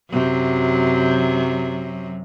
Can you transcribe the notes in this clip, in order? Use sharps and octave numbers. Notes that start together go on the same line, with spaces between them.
F#2 C3 F#3